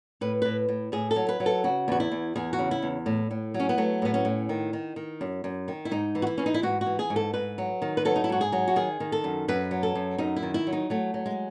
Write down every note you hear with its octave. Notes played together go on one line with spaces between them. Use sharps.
A2 B4
A2 B4
A2
A2 G#4
A4
F#3
B4
F#3
A4
C#3 F#4
E2 F#4
E4
E2
E2 G#4
F#4
C#3
E4
E2
A2
A2
F#3
C#4
B3
F#3 A3
A2 B3
C#4
A2
D#3
D#3
D#3
F#2
F#2
D#3
E4
G#2 D#4
E3
F#4
E4
E3 C#4
D#4
E4
G#2 F#4
F#4
E3
G#4
G#2
A4
G#2 B4
F#3
D#3
B4
F#3 A4
D#4
E4
G#2 F#4
G#4
F#3
F#4
D#3 G#4
D#3
A4
F#2
F#2 B4
F#3
A4
F#2
F#2 D#4
E4
D#3
E4
F#3
D#4
F#3 A3
F#3
G#3